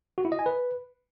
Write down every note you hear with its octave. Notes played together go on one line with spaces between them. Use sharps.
F#4
E4
D#5
G#5
B4